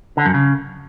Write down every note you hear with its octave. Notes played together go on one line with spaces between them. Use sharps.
D3
F#2
C#3